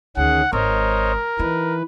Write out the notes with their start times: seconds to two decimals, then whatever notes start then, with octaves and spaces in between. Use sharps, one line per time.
0.17 D2 D#3 C#4 G#4 F#5
0.53 G#1 A#4 C5 C#5 D#5
1.40 E3 D#4 B4